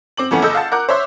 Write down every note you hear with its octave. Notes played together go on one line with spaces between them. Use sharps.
C4 D6 F#7
F2 E3 A3 B3 C#4
F#1 A4 D#5 E6 G6
F5 F#5 A5
A#4 F#5 D6 F#6 G6
C5 C#5 E5 C6